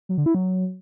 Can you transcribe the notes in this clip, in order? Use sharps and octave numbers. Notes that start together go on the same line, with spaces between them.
F#3
D3
E4
F#3